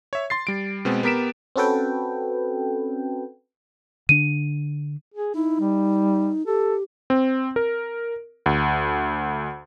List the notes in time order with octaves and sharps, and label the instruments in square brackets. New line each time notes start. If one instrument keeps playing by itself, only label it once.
[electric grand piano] C#5 E5
C6 A6 C7
G3 D7
B2 G#3 B3 C4
B3 G4 A#4 B6 D7 E7
[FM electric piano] C4 C#4 F#4 A4 B4 G5
[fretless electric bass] D3 D4 [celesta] D#7
[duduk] G#4
[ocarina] D#4 [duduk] E4
[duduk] G3
[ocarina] G4 [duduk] A4
[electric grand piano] C4
A#4
D2